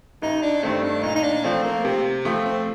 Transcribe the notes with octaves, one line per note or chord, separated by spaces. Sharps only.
A1 D#4
D4
G2 D#3 A3 C4
D4
A#2 D#4
D#4
D4
F3 A3 C4
A#3
C3 C4
F3 A3 C4
C4